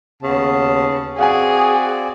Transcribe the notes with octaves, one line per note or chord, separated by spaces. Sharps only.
D#2 C#3 B3 A5
C4 F#4 G#4 D5 F5 F#5 G#5